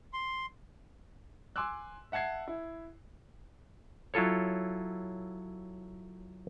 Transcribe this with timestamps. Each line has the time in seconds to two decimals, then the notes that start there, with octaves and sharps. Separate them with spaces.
0.13 C6
1.56 G#5 C6 D6 E6 F#6
2.12 E5 F#5 A5 G#6 C7
2.48 E4
4.14 F#3 E4 F4 A4 C#5